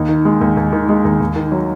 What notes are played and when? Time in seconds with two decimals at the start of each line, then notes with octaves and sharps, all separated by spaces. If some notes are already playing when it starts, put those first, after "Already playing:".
Already playing: D#2 D#4
0.09 D#3
0.25 G#3
0.41 D#2
0.57 D#2
0.73 D#3
0.89 G#3
1.05 D#2
1.20 D#2
1.36 D#3
1.52 F#3